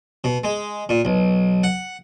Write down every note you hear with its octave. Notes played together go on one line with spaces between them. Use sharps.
B2
G#3
A#2
B1
F#5